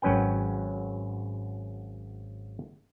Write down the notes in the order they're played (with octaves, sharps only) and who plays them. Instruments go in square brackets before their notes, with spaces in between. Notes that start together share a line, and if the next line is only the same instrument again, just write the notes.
[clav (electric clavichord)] G#1 F#3 C#4 B4 G5